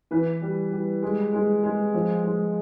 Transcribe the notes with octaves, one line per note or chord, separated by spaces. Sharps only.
E3 B4
G3
G3
G#3
G#3
G#3
F3
G#3